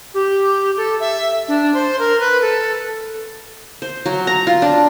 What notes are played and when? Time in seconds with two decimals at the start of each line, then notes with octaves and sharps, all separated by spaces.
0.14 G4
0.77 A4
1.00 E5
1.48 D4
1.74 C5
1.99 A#4
2.20 B4
2.41 A4
3.82 C5
4.06 F#3
4.27 A#5
4.47 F4
4.62 D4